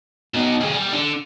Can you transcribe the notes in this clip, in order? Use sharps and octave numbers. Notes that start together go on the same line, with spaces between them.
B2 D#4
C3 G#4
G3
D3